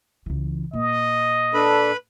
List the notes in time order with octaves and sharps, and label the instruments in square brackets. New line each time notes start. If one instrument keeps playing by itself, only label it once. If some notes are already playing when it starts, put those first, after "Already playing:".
[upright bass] C#2 E3
[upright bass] A#2 [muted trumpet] D#5
[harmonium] D4 A4 [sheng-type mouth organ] B4 B5